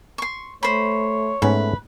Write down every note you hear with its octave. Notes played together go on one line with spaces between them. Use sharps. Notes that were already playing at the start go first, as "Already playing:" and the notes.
C6 C#6
A3 C5 C#5 B5
G#2 A3 B3 C#4 B4